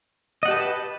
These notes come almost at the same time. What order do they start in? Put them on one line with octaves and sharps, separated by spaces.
D#5 F#5 G4 A5 B4